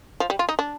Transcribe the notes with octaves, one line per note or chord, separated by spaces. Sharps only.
F3
G3
F4
D#4
D4